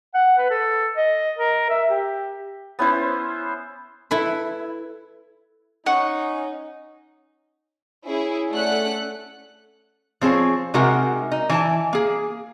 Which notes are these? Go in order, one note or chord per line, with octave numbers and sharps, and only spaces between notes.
F#5
B4
A4
D#5
A#4
E5
G4
B3 C#4 E4 C5
E4 A4 B4
C#4 D#4 F#5 C#6
C#4 E4 G#4
A3 C#4 D5 F#5 F#6
F3 C4 G#4 A#4 C#5
C3 G#3 D#4 F#4 A#4 F#5
D#4
E3 E4 C5 G#5 A5
A#3 G#4